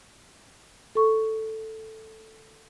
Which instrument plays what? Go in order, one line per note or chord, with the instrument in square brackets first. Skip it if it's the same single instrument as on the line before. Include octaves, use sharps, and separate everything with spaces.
[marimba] A4 C#6